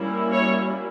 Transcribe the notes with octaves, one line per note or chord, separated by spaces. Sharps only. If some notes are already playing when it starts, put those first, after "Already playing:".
Already playing: G3 A#3 C#4 E4
C#5